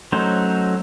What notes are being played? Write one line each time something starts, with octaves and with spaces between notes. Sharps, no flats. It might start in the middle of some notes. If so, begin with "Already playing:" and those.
F#3 A3 C#4 D#4 C5